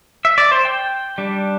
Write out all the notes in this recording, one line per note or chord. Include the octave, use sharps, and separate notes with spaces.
E5
D5
C5
G5
G3 D4